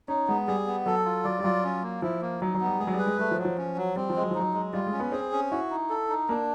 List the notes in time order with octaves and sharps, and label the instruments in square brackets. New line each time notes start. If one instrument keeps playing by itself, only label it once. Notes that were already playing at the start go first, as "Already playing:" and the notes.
[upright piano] C#4 [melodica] D#4
[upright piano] G#3 [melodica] B3
[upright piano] G3 [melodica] G#4
[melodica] B3
[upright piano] F#3 [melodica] A4
[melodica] F4
[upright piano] F#3 [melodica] D5
[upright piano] G3
[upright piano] F#3 [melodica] F4
[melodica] C#4
A#3
[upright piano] F3 [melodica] E4
[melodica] A#3
[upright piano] F#3 [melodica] D#4
[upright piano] F#3
[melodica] B3
[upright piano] G3
[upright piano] G#3 [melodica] G#4
[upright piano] F#3
G3
[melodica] B4
[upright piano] G#3
[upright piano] G3 [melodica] A3
[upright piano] F3
[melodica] F#3
[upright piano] F3
[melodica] C#4
F#3
[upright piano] G3 [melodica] C4
[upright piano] F3
[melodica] G#3
[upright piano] F#3
F3
[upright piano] F#3 [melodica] D#4
[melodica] G#3
[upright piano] G3 [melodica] F4
[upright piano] G#3
[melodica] C#4
[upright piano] B3
[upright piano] C4 [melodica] G#4
[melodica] C#4
[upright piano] E4 [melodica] F#4
[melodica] D#4
A4
D#4
[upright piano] A#3 [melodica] D4